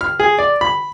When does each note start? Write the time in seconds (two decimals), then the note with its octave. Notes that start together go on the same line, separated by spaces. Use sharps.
0.01 F6
0.19 G#4
0.38 D5
0.61 B5